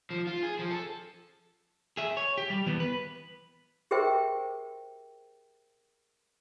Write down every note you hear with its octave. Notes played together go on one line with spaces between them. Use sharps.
F3
F4
G#4
F3
A4
G#4 E5
C#5
G4
G3
E3 B3
B4
G4 G#4 A#4 C5 E5 G5